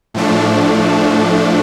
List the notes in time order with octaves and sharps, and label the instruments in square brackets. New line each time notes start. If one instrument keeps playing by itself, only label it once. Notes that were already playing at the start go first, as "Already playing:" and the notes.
[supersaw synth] A2 F3 A3 D4